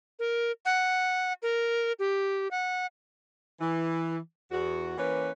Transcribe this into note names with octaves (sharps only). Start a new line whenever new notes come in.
A#4
F#5
A#4
G4
F#5
E3
E2 F#4
E3 A#3 C#4 B4